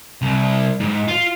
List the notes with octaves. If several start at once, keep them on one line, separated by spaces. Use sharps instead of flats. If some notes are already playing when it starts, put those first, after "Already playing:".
C2
G#2
F4